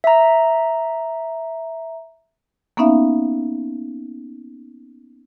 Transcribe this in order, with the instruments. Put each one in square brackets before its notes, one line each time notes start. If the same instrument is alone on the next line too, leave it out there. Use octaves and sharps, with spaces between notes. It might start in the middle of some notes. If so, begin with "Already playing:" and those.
[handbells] E5 A#5
[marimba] A#3 B3 C#4 D#4 E5 F5